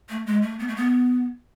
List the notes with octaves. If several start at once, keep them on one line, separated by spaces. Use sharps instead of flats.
A3
G#3
A3
B3
A3
B3